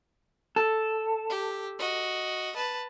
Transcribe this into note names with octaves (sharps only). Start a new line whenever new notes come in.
A4
G4
F#4 D#5
B4 A5